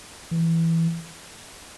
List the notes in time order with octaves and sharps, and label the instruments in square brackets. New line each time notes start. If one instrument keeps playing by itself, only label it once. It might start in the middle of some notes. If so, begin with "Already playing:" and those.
[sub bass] E3